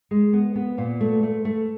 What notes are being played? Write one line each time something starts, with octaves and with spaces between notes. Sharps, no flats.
G#3
B3
B3
A#2
A3
A3
A3